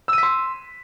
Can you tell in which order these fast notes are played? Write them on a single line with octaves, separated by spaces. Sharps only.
E6 D#7 B6 C6